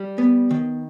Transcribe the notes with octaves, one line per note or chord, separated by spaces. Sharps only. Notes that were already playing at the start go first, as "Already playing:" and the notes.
Already playing: G3
B3
D#3